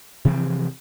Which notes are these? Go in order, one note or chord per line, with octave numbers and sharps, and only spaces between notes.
C3 E3 F3 C4